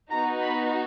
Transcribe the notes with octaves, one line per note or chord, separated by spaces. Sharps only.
B3 D#4 F#4 A#5
B5